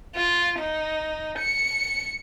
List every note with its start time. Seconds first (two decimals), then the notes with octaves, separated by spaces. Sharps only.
0.16 F4
0.59 D#4
1.39 C#7